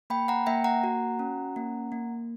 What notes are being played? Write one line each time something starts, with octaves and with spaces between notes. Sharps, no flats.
A#3 G5 B5
F#5 A#5
A#3 E5 G5
F#5 A#5
F#4
C#4
A#3
A#3